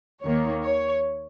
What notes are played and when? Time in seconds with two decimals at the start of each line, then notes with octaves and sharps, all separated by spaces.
0.22 D#2 D#3 A#3 C#5
0.63 C#5